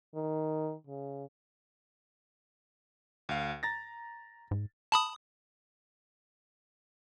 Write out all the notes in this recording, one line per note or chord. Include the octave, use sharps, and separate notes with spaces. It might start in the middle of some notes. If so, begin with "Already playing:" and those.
D#3
C#3
D2 F5
A#5 A6 A#6
G#2
A5 B5 D#6